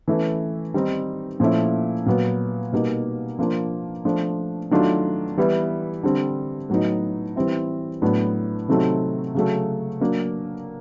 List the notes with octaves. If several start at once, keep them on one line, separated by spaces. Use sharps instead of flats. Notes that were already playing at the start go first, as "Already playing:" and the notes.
E3 A3 C#4 E4
D#3 G3 C4 D#4
A#2 F3 A3 C#4 E4
A#2 F#3 B3
B2 G3 A#3 D#4
F3 A#3 D4 F4
F3 A3 D4
D#3 F#3 A3 D4 F4
E3 G3 B3 E4
D3 G3 C4
A2 F#3 B3 D#4
E3 G3 C4 E4
A2 F#3 B3 D4
C3 D#3 F#3 A3 C4
C#3 F#3 A3
F#3 A#3 D4